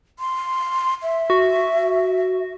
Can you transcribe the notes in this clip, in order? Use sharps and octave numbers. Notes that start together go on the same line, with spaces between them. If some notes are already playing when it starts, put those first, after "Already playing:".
C6
E5
F#4